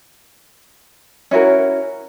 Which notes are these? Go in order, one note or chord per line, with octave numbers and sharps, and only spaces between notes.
C#4 E4 F#4 A#4